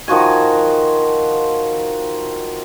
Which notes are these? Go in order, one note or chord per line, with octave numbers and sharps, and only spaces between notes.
D#3 F3 F#4 G#5